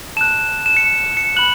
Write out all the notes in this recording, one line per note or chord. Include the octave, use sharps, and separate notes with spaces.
A5 F#6 E7
E7
C#7
C#7
B5 F#6 F#7